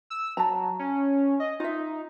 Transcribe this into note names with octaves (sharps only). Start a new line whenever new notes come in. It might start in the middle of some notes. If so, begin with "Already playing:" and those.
E6
F#3 A5 A#5
C#4
D#5
D#4 F4 E5